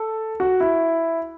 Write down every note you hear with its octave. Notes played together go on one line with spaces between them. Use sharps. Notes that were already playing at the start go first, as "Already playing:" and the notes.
Already playing: A4
F#4
E4